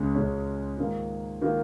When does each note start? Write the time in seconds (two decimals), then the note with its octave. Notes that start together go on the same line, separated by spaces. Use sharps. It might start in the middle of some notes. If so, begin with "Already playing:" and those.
Already playing: C#2 C#3 G#3 C#4
0.15 C#2 C#3 G#3 C#4
0.77 G#2 D#3 A#3 F4
1.41 D#3 A#3 F4